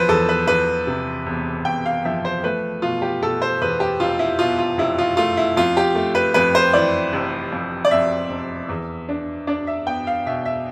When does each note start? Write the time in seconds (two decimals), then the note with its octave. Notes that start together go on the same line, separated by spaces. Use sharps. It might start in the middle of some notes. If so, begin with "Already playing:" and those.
Already playing: E1 F3 B4 C5
0.09 E2 A4
0.29 B4
0.47 E2 B4
0.87 C3
1.26 E1
1.65 E1 G5
1.86 F5
2.05 F3 E5
2.25 C5
2.44 A3 B4
2.82 B2 F4
3.02 G4
3.22 B2 A4
3.42 C5
3.62 E2 B4
3.80 G4
4.00 F1 F4
4.19 E4
4.39 B2 F4
4.58 F4
4.78 F1 E4
4.98 F4
5.17 A3 F4
5.37 E4
5.56 F2 F4
5.77 G4
5.95 A3
6.15 B4
6.34 F2 B4
6.55 C5
6.73 E3 D5
7.13 F1
7.52 F2
7.85 D5
7.91 F2 E5
8.30 F1
8.69 E2
9.09 D4
9.47 D4 D5
9.67 E5
9.86 B3 G5
10.07 F5
10.26 B2 E5
10.45 E5